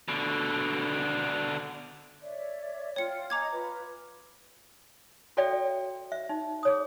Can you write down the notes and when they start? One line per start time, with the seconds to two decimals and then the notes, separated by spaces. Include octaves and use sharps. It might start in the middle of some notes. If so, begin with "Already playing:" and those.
0.08 B2 D3
2.21 C#5 D5 E5
2.96 F4 C#5 G5 C#7
3.30 D#5 G#5 A#5 D6 G#6
3.51 F4 B4
5.37 F#4 A4 C#5 D5 E5 G5
6.12 E5
6.29 D#4
6.63 G#4 C#5 D#6